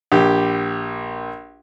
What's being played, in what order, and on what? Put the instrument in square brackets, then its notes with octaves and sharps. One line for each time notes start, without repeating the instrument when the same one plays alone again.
[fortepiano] A#1 G4